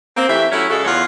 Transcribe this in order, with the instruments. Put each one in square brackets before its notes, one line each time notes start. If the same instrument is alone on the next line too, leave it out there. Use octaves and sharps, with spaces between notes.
[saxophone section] A#3 C4
E3 A3 G4 E5
F#3 A3 C#4 E4
C#3 G#3 F#4 A4
E2 F4 C#5 F#5